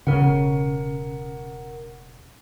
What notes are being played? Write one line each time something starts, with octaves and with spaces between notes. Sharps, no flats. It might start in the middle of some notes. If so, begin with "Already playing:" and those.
E1 C#3 A#4 F#5